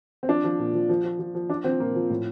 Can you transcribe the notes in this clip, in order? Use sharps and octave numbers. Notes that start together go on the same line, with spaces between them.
C4
F3 D4
F3
A#2
F3
F3
F3
F3
F3
F3 D4
F3 C4
A#2 A#3
F3
A2